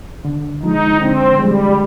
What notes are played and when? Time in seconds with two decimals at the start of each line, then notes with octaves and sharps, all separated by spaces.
0.25 D3
0.63 F3 G#3 D#4
1.00 D3 C4
1.39 F3 G3 G#3